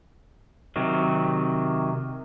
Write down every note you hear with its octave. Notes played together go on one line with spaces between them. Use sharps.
C3 D#3 F#3